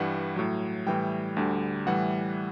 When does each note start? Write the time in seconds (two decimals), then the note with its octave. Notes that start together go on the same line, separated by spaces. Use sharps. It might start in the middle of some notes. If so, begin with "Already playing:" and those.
Already playing: G2 E3 G3 F#5
0.36 A2 F#3
0.86 A2 E3 G3 G5
1.37 D2 D3 G3
1.86 A2 E3 G3 F#5